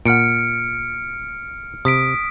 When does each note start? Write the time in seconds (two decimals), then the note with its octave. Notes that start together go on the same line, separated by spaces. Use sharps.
0.05 A#2 F#5 F6 C#7 D7
1.85 C3 D#6 B6 D7